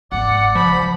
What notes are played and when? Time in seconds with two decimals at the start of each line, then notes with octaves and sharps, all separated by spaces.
0.12 G#1 C4 D5 F#5
0.55 C#2 F3 B5